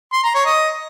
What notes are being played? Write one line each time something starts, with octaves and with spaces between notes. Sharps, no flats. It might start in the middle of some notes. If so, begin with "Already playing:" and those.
C6
A#5
C#5
D#5